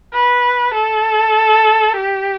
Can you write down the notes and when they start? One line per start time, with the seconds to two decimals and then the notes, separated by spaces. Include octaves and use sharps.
0.13 B4
0.74 A4
1.96 G4